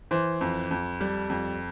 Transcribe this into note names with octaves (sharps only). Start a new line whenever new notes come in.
E3 C5
F2
F2
G3
F2